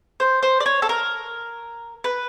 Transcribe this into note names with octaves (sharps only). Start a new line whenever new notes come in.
C5
C5
D5
C#5
A4
A#4
B4